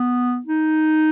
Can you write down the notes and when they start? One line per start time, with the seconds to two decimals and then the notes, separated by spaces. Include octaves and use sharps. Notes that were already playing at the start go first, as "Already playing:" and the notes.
Already playing: B3
0.46 D#4